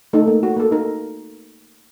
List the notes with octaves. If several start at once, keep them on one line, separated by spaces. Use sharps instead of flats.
A3 D#4 A4
A#3
F#4
A#3 A4
D#4 A#4